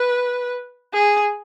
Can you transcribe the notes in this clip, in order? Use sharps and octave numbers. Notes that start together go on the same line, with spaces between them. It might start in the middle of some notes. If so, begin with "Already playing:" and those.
Already playing: B4
G#4